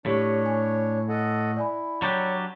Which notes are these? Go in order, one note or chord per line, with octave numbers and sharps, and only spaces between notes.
A2 D4 G4 C#5
G#5
A4 D#5 F#5
E4 D5 G#5 B5
F#3 D4 G4 C#5